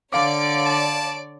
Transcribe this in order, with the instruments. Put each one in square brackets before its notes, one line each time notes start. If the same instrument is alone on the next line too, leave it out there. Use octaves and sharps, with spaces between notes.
[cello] D3 [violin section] C#5 D5 D7 [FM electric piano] F5 D6
[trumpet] A5